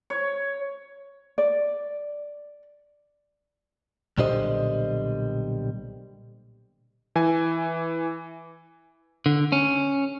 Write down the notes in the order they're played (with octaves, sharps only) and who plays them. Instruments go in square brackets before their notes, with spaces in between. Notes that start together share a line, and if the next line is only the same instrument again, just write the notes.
[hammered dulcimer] C#5
[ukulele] D5
[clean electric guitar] B1 A#2 D3 G3 C5 D#5
[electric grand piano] E3 G#5
[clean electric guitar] D3
C#4